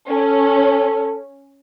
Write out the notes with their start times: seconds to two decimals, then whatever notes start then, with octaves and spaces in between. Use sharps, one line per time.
0.11 C#4 A4